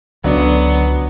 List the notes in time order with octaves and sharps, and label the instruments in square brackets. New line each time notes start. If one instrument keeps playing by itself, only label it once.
[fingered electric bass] C#2 [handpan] D3 [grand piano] F#3 D4 [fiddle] B3